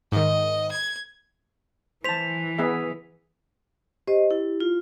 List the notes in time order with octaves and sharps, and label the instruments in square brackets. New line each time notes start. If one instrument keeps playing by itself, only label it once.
[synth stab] G#2 D#3 [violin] D#5
[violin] G#6
[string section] E3 [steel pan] C5 A5 [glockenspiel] B6 F7
[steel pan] B3 G#4 E5
[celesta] G4 [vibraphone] C5 D#5
[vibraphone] E4
F4